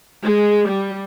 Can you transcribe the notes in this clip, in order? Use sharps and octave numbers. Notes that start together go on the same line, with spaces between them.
G#3
G3